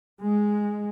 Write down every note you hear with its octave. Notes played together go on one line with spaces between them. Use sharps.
G#3